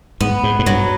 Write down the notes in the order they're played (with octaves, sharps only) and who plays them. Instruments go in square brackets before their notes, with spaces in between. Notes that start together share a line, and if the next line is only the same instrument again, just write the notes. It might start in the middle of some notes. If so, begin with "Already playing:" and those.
[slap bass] G#2 [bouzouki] B3
[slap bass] G#2
G#2
[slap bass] G2 [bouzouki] F#3